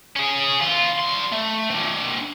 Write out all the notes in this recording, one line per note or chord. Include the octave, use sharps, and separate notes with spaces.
C#4 G#4
E3 F4
G3 C6
A3
C4 D4